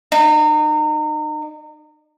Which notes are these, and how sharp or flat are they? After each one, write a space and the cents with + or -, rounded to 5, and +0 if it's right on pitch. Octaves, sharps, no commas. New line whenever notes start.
D#4 -35